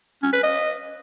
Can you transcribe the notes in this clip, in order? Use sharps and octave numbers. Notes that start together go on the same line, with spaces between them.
C#4
B4
D#5